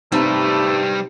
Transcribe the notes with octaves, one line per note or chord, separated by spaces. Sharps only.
C3 G3 A3 D#4 B4 A5